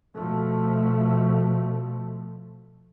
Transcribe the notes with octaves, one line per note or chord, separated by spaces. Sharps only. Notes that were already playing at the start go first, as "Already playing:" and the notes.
B2 F3 A3